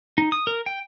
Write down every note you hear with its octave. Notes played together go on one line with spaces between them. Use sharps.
D#4
D#6
A#4
G5